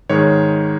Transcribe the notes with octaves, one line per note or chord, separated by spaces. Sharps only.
G#2 D#3 G#3 C#5